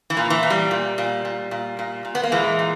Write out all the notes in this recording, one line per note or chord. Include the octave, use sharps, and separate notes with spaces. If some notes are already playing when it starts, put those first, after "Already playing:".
E3
A#2
E3
A#2
G3
A#2
A#2
A#2
A#2
A#2
A#2
B3
A#3
A#2 E3 G#3
A#2